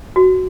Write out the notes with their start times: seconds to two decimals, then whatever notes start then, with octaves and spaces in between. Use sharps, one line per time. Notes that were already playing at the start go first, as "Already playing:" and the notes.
0.16 F#4